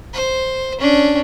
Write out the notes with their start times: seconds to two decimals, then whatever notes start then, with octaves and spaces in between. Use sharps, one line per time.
0.14 C5
0.79 C#4 D4